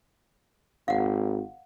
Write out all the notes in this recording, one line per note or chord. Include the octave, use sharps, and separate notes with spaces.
G#1 F5 F#5